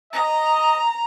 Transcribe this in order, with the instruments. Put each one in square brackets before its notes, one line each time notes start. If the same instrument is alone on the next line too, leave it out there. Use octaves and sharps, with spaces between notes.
[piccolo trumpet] D#5 [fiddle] A#5